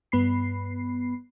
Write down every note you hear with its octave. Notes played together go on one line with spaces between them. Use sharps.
G2 B3 B5 C7